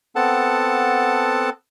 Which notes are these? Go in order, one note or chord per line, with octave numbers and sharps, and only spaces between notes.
B3 C4 A4 F#5 A5